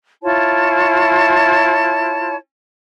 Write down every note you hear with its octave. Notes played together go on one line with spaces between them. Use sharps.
E4 F4 C#5 A5